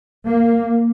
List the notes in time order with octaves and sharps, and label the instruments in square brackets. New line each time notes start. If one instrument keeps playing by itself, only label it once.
[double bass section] A#3